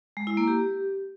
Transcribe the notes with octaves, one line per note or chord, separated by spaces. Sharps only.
G#3
E4
A#3
G4